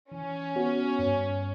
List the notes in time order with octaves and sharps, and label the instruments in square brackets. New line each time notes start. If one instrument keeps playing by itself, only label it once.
[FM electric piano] E3 [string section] C#4
[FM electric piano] B3 F#4 C#5
G2